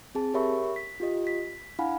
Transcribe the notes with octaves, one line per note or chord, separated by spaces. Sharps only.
C4 G#4 A5
G4 A#4 C#5 E5 B5 C#6
B6
F4 G4 D#5
B6
D4 E4 F5 F#5 G#5 B5